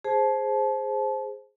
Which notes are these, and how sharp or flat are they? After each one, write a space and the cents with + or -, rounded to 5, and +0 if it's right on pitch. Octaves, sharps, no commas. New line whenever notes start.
G#4 +0 C5 +5 A5 -25